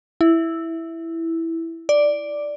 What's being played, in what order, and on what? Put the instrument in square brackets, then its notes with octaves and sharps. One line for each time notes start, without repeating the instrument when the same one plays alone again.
[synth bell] E4
D5